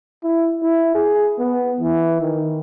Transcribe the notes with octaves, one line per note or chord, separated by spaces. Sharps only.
E4
E4
G#4
B3
E3
D#3